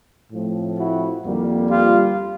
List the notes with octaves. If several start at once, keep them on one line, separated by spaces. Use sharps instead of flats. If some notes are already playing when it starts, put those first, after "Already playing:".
A2 F3 A3 C4
E4 F#4
F2 D3 G3 A#3
F4 G4